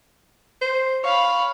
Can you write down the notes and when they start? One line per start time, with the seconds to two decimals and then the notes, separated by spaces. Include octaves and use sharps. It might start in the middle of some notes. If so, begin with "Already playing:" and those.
0.61 C5
1.04 C#5 F5 B5